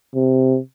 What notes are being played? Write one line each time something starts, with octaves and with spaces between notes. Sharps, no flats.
C3